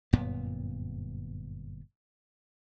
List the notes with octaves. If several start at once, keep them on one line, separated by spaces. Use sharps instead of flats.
G1 F#2 A#2 B3